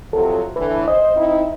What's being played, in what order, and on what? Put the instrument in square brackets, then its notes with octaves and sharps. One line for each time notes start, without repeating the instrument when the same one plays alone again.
[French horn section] C3 F3 F#3 [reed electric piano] A4
[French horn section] A2 D3 E3 [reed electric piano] B4
[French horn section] C5 [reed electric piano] D#5
[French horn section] C4 D#4 E4